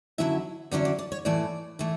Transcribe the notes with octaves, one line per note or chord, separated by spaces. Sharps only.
D3 F#3 C#4 E4 E5
D3 F#3 C#4 E4 D5
D5
D5
C#5
A2 E3 A3 E4 D5
A2 E3 A3 E4